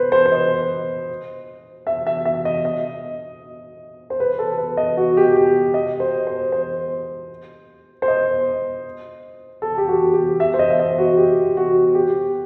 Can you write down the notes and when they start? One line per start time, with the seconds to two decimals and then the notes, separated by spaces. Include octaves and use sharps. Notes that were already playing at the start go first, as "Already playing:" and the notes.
Already playing: B4 C5
0.12 C5
0.26 C5
0.32 D#5
1.87 E5
2.07 E5
2.25 E5
2.45 D#5
2.65 D#5
4.10 C5
4.20 B4
4.39 A4
4.58 B4
4.77 D#5
4.97 F#4
5.17 G4
5.36 G4
5.74 D#5
6.00 C5
6.27 C5
6.52 C5
8.02 C5
8.08 D#5
9.62 A4
9.78 G4
9.88 F#4
10.14 G4
10.40 E5
10.54 C5
10.59 D#5
10.70 E5
10.80 D#5
10.98 F#4
11.17 G4
11.57 F#4
11.95 G4